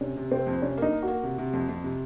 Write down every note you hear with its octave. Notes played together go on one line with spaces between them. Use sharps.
C3 C#4
C3
C3 C4
F2
C3 C#4
A#3 D#4
A#3
A#3 F#4
C3
C3
F2
F2
C3